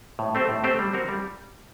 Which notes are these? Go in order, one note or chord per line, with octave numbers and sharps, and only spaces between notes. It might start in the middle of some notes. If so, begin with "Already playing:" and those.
A2
A3 C4 G4 C5
A2
A3 C4 G4 C5
G3
C4 F#4 A#4
G3